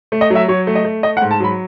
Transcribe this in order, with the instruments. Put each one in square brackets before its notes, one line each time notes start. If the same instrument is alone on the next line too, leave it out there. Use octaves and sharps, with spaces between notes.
[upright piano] A3
D#5
F#3 E5
F#3 C#5
A3
D#5
A3
A3 D#5
F#5
G#2
A5
F#3 B5